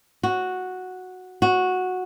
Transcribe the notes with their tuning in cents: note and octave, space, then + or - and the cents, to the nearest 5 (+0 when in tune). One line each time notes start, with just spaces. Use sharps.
F#4 -5
F#4 -10